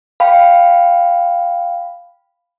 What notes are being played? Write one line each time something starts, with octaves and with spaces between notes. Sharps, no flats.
F5 G5 B5